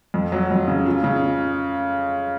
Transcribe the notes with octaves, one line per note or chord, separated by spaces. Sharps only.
F2
F#3
F2
C#3
F4
C#3